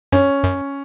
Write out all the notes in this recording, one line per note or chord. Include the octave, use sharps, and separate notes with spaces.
F#2 C#4
F#2